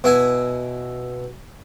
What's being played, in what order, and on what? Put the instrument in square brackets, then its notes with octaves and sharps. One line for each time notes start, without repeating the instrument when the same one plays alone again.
[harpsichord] B2 E4 G#5